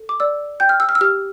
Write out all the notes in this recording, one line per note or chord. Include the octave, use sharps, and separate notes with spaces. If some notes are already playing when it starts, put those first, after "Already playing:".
Already playing: A4
D6
D5 E6
G5 G6
F6
E6
F6
E6
G4 F6